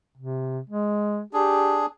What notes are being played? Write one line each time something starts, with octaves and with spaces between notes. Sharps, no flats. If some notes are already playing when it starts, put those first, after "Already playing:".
C3
G#3
D4 G4 G#4